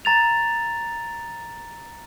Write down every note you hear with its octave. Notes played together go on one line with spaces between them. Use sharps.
A#5 A6 F7